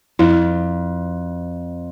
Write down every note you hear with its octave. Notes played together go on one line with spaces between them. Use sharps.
F2 E4